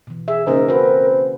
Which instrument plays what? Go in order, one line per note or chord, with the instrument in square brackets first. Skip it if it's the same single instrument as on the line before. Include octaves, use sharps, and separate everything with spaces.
[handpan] B2 E3
[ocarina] G#4 [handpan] E5
[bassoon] G#2 [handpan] C#3 A#3 C#4 [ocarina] A#4
[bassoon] C4 [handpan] F#4 B4